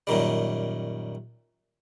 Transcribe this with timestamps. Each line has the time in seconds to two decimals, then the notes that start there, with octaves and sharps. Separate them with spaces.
0.07 F#2 A#2 D#3 G3